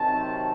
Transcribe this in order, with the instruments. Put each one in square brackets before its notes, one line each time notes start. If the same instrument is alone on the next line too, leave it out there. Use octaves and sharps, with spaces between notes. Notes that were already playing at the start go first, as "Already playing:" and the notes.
Already playing: [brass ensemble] C3 D#3 F#3 C4 A5